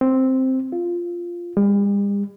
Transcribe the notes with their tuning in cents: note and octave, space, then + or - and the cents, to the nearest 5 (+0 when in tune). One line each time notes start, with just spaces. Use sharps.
C4 +0
F4 -5
G3 +45